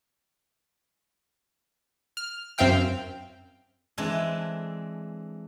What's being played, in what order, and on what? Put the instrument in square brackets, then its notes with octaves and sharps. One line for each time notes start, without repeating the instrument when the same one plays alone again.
[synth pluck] F6
F#2 C4 E5 F5 G5 F6
[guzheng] E3 G#3 C4 D4 A4